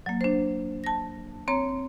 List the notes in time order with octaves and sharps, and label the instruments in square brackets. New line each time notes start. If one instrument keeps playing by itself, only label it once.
[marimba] F#3 A#3
D4 C5
A5 A#6
C4 C#5 A#5